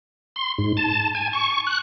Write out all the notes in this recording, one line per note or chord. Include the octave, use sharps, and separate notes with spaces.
C6
G#2
A5
G#5
C#6
F#6